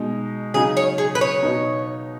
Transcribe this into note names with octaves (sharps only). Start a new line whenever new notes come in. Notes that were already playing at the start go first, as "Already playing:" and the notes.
Already playing: B2 G#3 D#4
C#3 F#3 D#4 G#4
C#5
G#4
B4
C#5
B2 B3 D#4